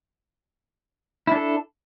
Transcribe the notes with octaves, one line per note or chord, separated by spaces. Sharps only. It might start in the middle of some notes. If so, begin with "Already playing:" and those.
D4 E4 A4